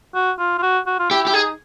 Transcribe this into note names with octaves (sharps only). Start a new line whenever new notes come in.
F#4
F4
F4
F#4
F#4
F4
E4 G4
E4 G4
D#4 G#4